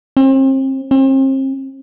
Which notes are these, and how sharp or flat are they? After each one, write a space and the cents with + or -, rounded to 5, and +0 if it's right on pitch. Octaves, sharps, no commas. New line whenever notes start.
C4 +35
C4 +40